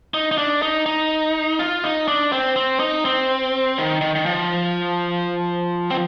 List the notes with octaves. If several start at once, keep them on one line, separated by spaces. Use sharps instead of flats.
D#4
D#4
D4
D#4
D#4
F4
D#4
D4
C4
C4
D#4
C4
D#3
D#3
D#3
F3
C4